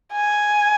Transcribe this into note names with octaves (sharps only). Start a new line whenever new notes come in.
G#5